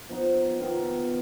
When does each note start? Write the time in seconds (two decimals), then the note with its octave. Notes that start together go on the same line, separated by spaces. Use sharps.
0.09 F3 B3 D#4 B4
0.60 D#3 B3 F4